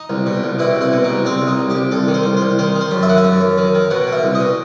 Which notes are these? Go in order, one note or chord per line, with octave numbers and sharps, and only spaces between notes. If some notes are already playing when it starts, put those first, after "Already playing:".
Already playing: D#4
C2
B2
C2
B2 E4
C2
E4
B2
D#4
C2
C2 C4
C2
D#4
C2
G4
C2
C2 A4
D#3
C5
C2
C5
C2
D#3 C5
D#3
C5
F#2
E5
D#3 F#5
E5
F#2
F#2
D#3
D#3
B2 F#5
B2
E5
C2
B2 D#5